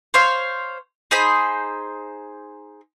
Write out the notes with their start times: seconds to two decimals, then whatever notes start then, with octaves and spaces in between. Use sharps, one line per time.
0.14 C5 C#5 F5
1.11 D#4 G#4 C5 B5